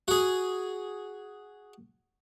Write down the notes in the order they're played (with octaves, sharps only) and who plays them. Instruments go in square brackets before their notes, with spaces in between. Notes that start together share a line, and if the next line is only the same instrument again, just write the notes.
[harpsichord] F#4 G#4